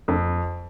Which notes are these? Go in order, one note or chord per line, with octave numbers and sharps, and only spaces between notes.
F2